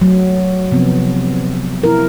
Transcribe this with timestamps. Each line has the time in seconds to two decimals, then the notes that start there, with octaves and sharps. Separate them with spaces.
0.01 F#3 A3
0.71 C3 F3 B3 C4
1.84 E4 A#4